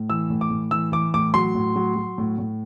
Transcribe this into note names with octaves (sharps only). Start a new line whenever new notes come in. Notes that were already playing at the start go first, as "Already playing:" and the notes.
Already playing: A2
E3 E6
A2
D6
A2
E3 E6
E3 D6
A2 D6
F#3 C6
A2
F#3
F#3
A2
A2